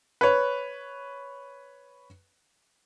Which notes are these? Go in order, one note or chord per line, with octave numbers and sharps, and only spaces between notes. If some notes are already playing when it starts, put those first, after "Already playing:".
B4 C#5